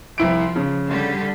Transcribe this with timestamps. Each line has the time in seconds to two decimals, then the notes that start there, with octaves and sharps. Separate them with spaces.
0.18 C2 F3 E4 D7
0.56 C#3
0.89 D3 G3 G4